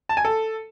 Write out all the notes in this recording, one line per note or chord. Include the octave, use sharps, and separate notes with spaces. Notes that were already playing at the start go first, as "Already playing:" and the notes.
A5
G#5
A4